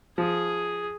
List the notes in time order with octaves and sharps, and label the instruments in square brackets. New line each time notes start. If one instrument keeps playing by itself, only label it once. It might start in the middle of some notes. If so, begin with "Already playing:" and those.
[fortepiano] F3 [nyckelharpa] G#4